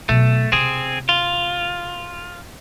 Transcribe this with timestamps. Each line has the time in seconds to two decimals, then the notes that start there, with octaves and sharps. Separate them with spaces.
0.09 B2 F#3 A3
0.52 C3 C4 G#4
1.09 F4